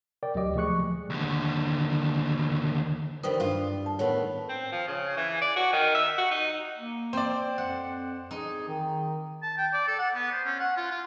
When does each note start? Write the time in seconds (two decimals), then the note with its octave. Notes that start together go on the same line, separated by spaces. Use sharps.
0.23 A#4 D5 G5
0.35 D2 F#3 G4 D#5 D6
0.55 F3 A3 G#4 C#6 F#6 C#7
1.10 D#2 D3
3.23 D#3 E3 G3 B4 C5 D#6
3.40 G2 F4
3.86 A5
3.99 A2 D#3 B3 C#5
4.49 C4
4.72 F3
4.88 C#3
5.17 E3
5.41 D5
5.56 F#4
5.73 D#3
5.94 E5
6.18 F#4
6.31 D#4
6.77 A#3
7.13 C4 C5 D5
7.58 F2 F#5
8.31 D#4 G#4
8.68 D#3
9.43 A5
9.58 G5
9.73 D5
9.88 A4
9.99 F#5
10.14 B3
10.32 C5
10.45 C#4
10.60 F#5
10.77 F4
10.91 F4